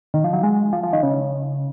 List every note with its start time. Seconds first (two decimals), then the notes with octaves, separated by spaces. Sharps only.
0.14 D#3
0.24 F3
0.33 F#3
0.43 G#3
0.73 F3
0.83 F3
0.93 D#3
1.03 C#3